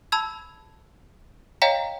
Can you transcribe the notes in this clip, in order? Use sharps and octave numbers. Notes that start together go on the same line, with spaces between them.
A5 B5 E6 G#6
C#5 D#5 F5 G5 A#5 B6